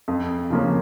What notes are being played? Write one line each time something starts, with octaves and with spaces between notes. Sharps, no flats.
F2
C#3 F3 A#3 C#4